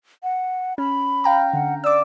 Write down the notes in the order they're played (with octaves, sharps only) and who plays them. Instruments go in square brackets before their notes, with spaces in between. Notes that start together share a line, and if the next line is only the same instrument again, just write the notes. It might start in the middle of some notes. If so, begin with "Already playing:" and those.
[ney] F#5
[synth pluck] C#4 [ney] B5
[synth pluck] F5 G5 A#5
[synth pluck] D3 [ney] F#5
[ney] D5 [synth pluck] D6 E6